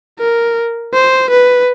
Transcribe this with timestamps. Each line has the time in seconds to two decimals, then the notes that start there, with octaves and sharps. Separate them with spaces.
0.19 A#4
0.94 C5
1.30 B4